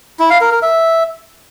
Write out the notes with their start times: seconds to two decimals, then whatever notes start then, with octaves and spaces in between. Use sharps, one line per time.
0.19 E4
0.30 F5
0.41 A#4
0.52 A#4
0.62 E5